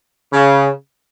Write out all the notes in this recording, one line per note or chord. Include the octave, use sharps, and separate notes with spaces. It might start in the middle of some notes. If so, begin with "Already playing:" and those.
C#3